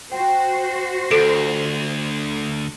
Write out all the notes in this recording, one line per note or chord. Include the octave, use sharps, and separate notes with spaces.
F#4 C5 G5
D2 A4 D7